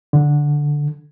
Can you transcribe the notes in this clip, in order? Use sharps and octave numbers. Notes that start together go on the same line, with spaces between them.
D3